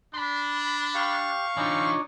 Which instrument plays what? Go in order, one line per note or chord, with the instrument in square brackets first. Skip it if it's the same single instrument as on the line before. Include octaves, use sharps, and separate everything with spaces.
[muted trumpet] D4 [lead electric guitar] B5 C6
[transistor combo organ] G4 [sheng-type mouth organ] F5 C#6
[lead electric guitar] E3 F4 [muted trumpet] C4 [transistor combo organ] D4 D#4 C#5